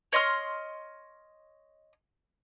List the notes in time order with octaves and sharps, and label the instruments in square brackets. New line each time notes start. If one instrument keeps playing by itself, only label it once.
[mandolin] C#5 D#5 C6 F6